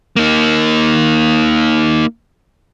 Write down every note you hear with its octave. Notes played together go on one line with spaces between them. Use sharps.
A#3 D#4